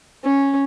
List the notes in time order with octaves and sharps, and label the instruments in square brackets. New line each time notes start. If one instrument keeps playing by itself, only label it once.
[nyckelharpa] C#4